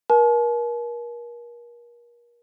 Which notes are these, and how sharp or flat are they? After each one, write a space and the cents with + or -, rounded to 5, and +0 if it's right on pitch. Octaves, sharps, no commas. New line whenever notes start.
A#4 +35 A5 -45